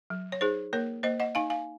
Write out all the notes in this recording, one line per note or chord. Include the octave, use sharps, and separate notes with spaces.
F#3
C#5
D#4 G#4 C5
A#3 A#4 C#5
A#3 C5 D#5
D#5 F#5
D#4 F5 G#5
F5 G#5